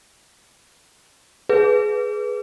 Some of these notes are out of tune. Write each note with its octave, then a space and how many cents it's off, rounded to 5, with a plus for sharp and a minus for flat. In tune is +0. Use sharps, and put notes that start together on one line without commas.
G#4 +15 B4 +0